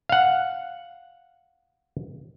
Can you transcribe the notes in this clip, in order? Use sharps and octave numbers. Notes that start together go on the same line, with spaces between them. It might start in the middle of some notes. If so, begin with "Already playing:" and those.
F5 F#5